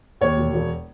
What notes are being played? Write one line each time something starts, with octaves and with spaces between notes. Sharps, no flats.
D#2 C#5
E1
E1